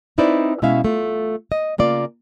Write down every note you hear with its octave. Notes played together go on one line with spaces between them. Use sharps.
C4 D#4 E4 B4 C5 D5
B2 G#3 C#4 E4 E5 F5
A3 F4
D#5
C#3 A#3 F4 D5